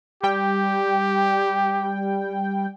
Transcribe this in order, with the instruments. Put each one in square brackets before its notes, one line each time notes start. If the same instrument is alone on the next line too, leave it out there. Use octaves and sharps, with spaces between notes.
[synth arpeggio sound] G3 G5 [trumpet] G4